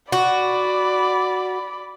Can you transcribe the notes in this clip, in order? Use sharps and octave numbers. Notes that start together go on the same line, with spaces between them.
F#4 D5 B5